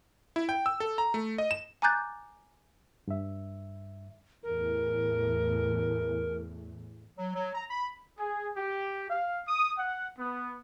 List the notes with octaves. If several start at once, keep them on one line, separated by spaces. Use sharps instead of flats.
E4
G5
E6
A4
A#5
A3
D#5
E7
G#5 A#5 D6 F#6 G6 A6
G2 E5
E2 A2 A#4
F#3
F#3
A#5
B5
G#4
G4
F5
D#6
F#5
B3